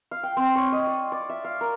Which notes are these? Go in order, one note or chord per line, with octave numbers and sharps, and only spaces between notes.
F5
G5
C4
C#5
D#5
D5
D5
E5
F5
A#4